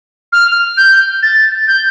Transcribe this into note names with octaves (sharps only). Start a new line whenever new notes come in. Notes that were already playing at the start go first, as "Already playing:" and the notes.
F6
G6
A6
G6